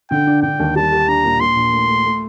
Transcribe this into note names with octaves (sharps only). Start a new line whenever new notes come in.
D3 G5
D4
D3 G5
D#2
G3 A5
G4
D4 A#5
A#2
A#2 C6
A#1
A3
A3
A3